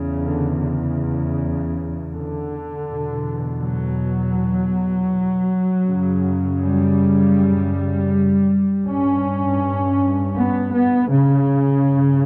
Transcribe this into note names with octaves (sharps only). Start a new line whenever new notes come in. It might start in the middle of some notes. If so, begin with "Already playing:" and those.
Already playing: E2 C#3
D3
C#3
D3
E2 B2
F#3
F#2 C#3
G3
G2 C#4
B3
B3
C#3
G2